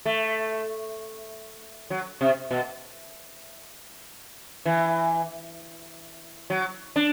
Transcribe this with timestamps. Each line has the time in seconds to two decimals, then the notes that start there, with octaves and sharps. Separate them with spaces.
0.06 A3
1.90 F#3
2.21 C3
2.51 B2
4.65 E3
6.50 F#3
6.96 D4